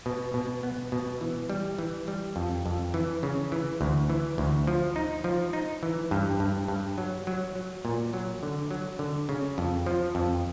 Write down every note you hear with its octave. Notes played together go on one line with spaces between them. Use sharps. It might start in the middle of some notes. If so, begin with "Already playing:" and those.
B2
B2
B3
B2
E3
G3
E3
G3
F2
F2
E3
C#3
E3
D2
E3
D2
F3
D#4
F3
D#4
E3
G2
G2
G2
F#3
F#3
F#3
A#2
F#3
D3
F#3
D3
C#3
F2
F3
F2